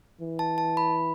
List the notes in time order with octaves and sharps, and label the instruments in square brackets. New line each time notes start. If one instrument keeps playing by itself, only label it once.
[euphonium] E3
[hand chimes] A5
A5
B5